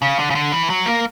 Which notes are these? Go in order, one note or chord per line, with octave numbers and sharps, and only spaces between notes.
C#3
D3
C#3
D3
E3
F#3
A#3